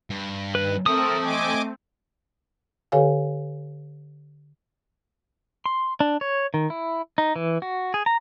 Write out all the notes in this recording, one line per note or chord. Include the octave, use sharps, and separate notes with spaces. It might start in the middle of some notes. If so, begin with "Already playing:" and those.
G2
D#3 B4
A3 C4 A4 A#4 C5 A5 D#6
D#5 G#5 D6
D3 G4 A4 C#5 F5 G#5
C6
D4
C#5
D#3
E4
D#4
E3
F#4
G#4
A#5